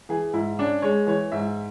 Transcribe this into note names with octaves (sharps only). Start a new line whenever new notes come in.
E3 G#4
G#2 E4
C#4 D4
G#3 C#5
E3 C#5
G#2 E5